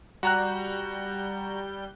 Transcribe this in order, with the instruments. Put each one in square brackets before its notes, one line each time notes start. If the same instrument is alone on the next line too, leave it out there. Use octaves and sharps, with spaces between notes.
[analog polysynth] G3 G6 [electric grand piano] F#4 A#5 F#6